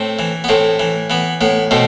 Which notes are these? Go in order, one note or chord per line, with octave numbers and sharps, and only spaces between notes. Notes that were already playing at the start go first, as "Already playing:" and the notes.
Already playing: A2 A3 C4
E3
B3
A2 A3 C4
E3
E3 B3
A2 B3
B2 A3 C4